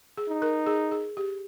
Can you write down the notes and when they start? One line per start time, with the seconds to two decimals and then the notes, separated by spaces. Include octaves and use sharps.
0.17 G#4
0.29 D#4
0.42 A#4
0.67 G#4
0.92 G#4
1.17 G4